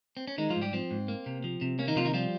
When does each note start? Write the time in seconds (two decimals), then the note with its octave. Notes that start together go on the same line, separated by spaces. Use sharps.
0.17 C4
0.28 C#4
0.38 D#3 G#3 D#4
0.50 F3 F4
0.56 G#2
0.61 G3 G4
0.73 F3 C4
0.91 G#2
1.08 A#3
1.26 C3
1.44 F3
1.61 C3
1.79 A#3 C#4
1.87 D#3 D#4
1.96 C3 F3 F4
2.05 D#3 D#4
2.14 F3 G3 F4